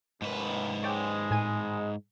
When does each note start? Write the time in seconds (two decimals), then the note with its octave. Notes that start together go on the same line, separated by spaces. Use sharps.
0.22 A1 D#2 G#2 B4
0.83 G#3 C#5 D5 G5
1.31 A2 G#5 D#7